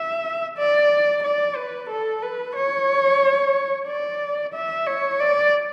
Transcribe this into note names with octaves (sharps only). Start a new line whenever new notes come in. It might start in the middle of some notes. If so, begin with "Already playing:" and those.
Already playing: E5
D5
D5
B4
A4
B4
C#5
D5
E5
C#5
D5